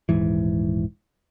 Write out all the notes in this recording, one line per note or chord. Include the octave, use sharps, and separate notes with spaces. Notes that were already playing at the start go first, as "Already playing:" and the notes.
D#1 G#2 E3